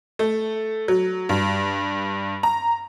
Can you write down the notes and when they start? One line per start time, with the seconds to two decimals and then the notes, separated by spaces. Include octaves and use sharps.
0.19 A3
0.88 F#3
1.29 G2
2.43 A#5